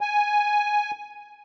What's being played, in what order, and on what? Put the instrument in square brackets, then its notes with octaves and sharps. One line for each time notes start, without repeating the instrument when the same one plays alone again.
[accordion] G#5